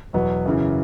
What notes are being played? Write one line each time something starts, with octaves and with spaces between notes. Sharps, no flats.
E2 B2 F#3 B3
F#2 C#3 E3